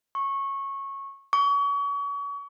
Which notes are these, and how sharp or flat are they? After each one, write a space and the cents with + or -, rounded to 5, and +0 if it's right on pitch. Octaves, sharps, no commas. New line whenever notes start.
C#6 -15
C#6 +35